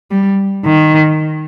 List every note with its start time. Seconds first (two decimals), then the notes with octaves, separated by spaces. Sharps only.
0.11 G3
0.65 D#3